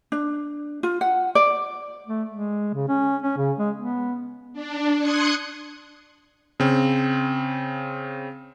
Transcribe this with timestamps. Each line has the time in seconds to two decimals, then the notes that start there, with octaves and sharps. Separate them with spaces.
0.12 D4
0.83 F4
1.01 F#5
1.35 D5
2.07 A3
2.30 G#3
2.74 C#3
2.88 C#4
3.22 C#4
3.37 C#3
3.59 G#3
3.77 B3
4.53 D4
4.98 C6 D#6 F#6 G#6 C#7
6.60 C#3 C4